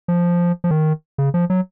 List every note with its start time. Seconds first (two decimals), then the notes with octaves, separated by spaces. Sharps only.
0.08 F3
0.64 F3
0.71 D#3
1.18 C#3
1.34 F3
1.50 F#3